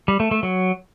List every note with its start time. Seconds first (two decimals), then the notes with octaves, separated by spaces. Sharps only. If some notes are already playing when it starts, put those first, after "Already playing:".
0.08 G3
0.20 A3
0.31 A3
0.43 F#3